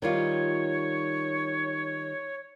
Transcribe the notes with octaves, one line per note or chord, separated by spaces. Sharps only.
D#3 G3 F4 C#5